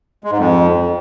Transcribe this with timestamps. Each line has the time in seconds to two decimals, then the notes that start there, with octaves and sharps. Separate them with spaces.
0.24 G#3
0.31 G#2
0.38 F2